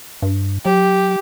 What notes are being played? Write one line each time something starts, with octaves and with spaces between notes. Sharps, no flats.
G2
F#3 G4